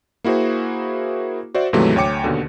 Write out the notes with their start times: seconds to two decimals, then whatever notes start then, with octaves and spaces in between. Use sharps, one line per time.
0.24 A#3 E4 F#4 G#4 C5
1.55 F#4 C5 D5 E5
1.73 D#2 G#2 C3 E3 F#3 A3
1.96 D2 C#5 G5 D6 C#7
2.24 D#2 B2 D3